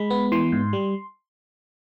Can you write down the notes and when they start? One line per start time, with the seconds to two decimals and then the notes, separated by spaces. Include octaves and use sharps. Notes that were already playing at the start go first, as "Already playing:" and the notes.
Already playing: G#3 B5
0.10 B3
0.32 E3 C6
0.52 G#2
0.73 G3